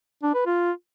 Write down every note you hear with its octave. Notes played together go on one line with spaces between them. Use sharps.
D4
B4
F4